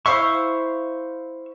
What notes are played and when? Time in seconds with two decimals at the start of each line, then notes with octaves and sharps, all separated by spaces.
0.06 E4 C5 F5 C#6 E6